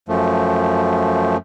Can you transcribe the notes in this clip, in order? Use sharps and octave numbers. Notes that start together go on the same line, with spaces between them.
F#2 F3 A3